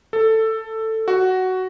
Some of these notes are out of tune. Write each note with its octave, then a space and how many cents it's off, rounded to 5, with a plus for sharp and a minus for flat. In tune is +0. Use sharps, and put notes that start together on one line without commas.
A4 +10
F#4 +10